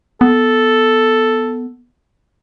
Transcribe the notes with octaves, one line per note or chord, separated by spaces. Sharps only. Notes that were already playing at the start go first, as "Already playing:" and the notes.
B3 A4